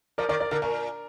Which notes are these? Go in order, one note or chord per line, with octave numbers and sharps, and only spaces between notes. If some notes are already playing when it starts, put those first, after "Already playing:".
F3 A#4 D5
D#3 A#4 D5
A#4 D5
D3 A#4
A#2 A#4